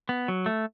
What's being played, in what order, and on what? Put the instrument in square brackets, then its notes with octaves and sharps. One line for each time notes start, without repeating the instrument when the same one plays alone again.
[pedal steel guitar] B3
F#3
A3